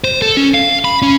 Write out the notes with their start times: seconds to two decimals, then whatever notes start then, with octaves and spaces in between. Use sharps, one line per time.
0.04 C5
0.22 A4
0.37 C#4
0.54 F5
0.84 B5
1.02 C#4